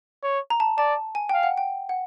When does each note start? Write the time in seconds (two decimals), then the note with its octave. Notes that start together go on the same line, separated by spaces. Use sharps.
0.23 C#5
0.50 A#5
0.60 A5
0.78 D5 A5
1.15 G#5
1.29 F5 G5
1.43 F#5
1.58 G5
1.89 F#5